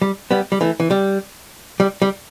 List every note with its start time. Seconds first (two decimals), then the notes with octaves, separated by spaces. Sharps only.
0.02 G3
0.31 G3 B3
0.52 G3
0.61 E3 A3
0.80 E3
0.91 G3
1.80 G3
2.02 G3